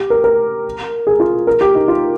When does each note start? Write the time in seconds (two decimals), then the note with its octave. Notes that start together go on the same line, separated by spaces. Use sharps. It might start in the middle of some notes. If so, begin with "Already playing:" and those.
Already playing: G4
0.10 A#4
0.24 A#4
1.07 G#4
1.20 F4
1.47 A#4
1.61 G4
1.75 D#4
1.88 F4